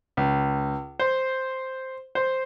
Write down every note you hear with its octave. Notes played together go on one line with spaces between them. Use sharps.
C#2
C5
C5